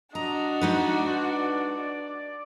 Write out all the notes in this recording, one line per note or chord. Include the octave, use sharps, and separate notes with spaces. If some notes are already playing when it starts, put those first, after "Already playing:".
D4 F#4 D#5 A#5
G#3 D#4 B4 D5